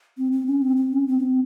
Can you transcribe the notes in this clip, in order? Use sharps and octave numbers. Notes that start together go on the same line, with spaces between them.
C4
C4
C#4
C4
C4
C#4
C4
C#4
C4